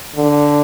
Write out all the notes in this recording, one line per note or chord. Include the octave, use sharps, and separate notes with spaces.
D3